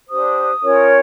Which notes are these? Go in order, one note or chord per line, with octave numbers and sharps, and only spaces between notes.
D4 G4 C5 D#6
C#4 F4 A#4 C#5